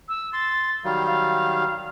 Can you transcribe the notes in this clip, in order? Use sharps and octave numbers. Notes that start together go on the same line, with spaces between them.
E6
C6 A6
D#3 F#3 G3 F5
F5